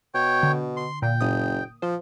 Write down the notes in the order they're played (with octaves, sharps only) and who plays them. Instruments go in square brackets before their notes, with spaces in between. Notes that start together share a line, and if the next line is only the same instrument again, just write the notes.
[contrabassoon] B2 [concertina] C#5 G5
[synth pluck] D3
[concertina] C6
[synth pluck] A#2 [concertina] G5
[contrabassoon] F#1 [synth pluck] D#6
[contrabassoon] F3 [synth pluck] C5